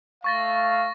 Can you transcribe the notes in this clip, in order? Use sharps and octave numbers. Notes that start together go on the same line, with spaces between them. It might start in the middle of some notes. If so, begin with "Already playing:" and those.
A3 F5 C#6 A6 A#6